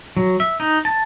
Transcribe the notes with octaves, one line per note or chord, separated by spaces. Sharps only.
F#3
E5
D#4
A5